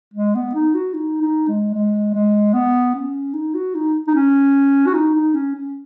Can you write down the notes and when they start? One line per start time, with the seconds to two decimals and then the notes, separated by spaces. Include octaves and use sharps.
0.14 G#3
0.35 B3
0.54 D#4
0.74 F#4
0.94 D#4
1.22 D#4
1.48 G#3
1.74 G#3
2.14 G#3
2.54 B3
2.95 C#4
3.34 D#4
3.54 F#4
3.75 D#4
4.07 D#4
4.15 C#4
4.86 F#4
4.94 D#4
5.15 D#4
5.34 C#4
5.55 C#4